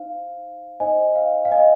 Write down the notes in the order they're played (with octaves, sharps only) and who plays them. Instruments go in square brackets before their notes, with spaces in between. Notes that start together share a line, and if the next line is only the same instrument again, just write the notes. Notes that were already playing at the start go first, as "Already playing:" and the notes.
Already playing: [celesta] D#4 C5 F5
D#4 C5 D#5 G#5
F5
F5
D#5 G#5